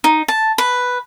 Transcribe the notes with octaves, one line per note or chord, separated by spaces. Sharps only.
D#4
A5
B4